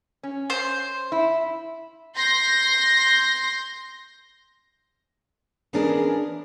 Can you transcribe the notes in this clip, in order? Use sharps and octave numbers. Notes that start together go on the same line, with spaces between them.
C#4
C5
E4
C6 G6 A#6
E3 B3 C#4 D4 G#4 A#4